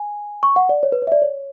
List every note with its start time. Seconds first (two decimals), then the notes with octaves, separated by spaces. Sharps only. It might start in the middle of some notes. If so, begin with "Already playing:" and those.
Already playing: G#5
0.43 C#6
0.56 F#5
0.69 D5
0.83 C#5
0.92 B4
1.02 C#5
1.07 E5
1.12 D5
1.22 C#5